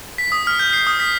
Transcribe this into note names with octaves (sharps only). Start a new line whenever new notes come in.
B6
D#6
F6
G6
C7
D#6
B6